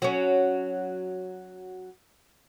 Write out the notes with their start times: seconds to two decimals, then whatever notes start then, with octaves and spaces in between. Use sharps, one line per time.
0.02 F#3 C#4